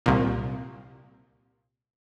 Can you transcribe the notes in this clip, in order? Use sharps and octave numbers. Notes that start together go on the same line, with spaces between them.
C2 A#2